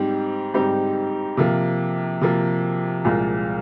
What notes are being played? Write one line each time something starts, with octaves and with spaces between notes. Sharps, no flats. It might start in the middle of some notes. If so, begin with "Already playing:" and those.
Already playing: G#2 G3 C4 D#4 G4
G#2 G3 C4 D#4 G4
C3 F3 A#3
C3 F3 A#3
C2 A#2 F3 G#3